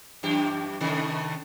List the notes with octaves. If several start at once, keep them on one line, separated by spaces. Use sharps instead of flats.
F#2 E3 G4
A2 C3 D#3